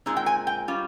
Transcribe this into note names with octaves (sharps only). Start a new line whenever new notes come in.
A#2 G#3 C4 D#4
G5
G#5
G5
G3 C#4 F4